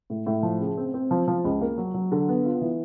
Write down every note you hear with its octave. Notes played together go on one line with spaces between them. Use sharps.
A2
A2
F3
C#3
C4
C4
F3
F3
C#2
A#3
F#3
F#3
D3
B3
F4
E3